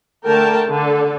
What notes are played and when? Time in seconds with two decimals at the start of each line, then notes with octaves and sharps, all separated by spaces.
0.25 D3 A3 A#4 G5 A5
0.67 D3 A4